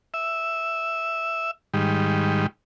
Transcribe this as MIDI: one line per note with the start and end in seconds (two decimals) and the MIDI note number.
0.14 1.51 76
1.74 2.46 44
1.74 2.46 51
1.74 2.46 55